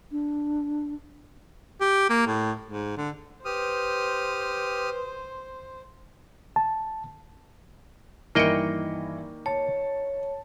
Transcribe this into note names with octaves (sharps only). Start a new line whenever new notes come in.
D4
G4
A#3
A2
G#2
D3
G4 B4 C5 D#6 F6
A5
G2 D#3 E3 A#3 D#5 G5 C#7
C#5 A5